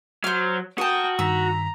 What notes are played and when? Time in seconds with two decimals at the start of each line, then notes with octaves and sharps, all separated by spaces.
0.24 F#3 C5 F6
0.78 F#4 A#4 G5 A5 D#6
1.19 G2 D#3 A#5 E6 B6